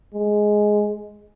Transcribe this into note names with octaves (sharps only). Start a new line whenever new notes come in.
G#3